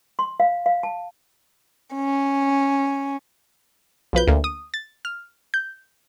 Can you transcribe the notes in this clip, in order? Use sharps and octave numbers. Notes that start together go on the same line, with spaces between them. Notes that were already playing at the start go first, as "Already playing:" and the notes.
C6
F5
F5
A5
C#4
B1 F3 B4 G6
D2 A#3
D#6
A6
F6
G6